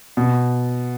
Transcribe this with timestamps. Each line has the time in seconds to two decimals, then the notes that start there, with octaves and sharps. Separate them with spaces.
0.17 B2